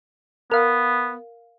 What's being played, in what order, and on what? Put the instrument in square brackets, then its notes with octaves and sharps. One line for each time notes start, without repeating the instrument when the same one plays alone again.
[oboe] B3 [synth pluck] A#4 F5